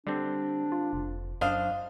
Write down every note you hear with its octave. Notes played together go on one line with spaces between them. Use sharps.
D3 G3 C4 D4
F4
F1
F#2 D4 C5 D#5 F5